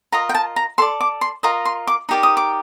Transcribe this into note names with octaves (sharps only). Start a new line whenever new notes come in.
F4 A#4 D#5 A#5
G5
A5
A#5
A4 D5 C6
D6
C6
F4 A#4 D#5 A#5
C6
D6
D#4 G4 A#4 D5
D#6
D6